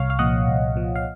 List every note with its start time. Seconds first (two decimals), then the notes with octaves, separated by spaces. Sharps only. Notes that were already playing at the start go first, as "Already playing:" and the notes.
Already playing: C2 C#5 F5
0.10 F5
0.19 A#2 F3 D#5 F#5
0.48 C2
0.76 A#2 F3
0.96 F5